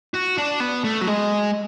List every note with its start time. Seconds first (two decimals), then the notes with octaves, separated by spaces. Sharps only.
0.14 F#4
0.38 D4
0.60 B3
0.84 A3
1.01 F#3
1.07 G#3